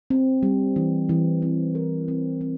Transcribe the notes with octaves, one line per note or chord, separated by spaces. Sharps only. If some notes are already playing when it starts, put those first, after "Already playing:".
C4
G3
E3
E3
C4
A#4
C4
C4